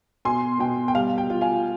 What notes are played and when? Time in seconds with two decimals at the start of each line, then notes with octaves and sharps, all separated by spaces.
0.25 B2 G#5 C6
0.60 B2 G5
0.88 G5
0.95 G3 F5
1.18 G5
1.30 F4
1.41 F5 G#5